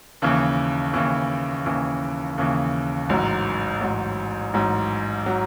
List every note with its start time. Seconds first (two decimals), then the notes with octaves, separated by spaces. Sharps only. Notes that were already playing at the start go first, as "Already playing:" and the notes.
0.22 D#2 C#3 E3
0.94 D#2 C#3 E3
1.66 D#2 C#3 E3
2.38 D#2 C#3 E3
3.09 A1 G#2 F#3
3.81 A1 G#2 F#3
4.53 A1 G#2 F#3
5.26 F#3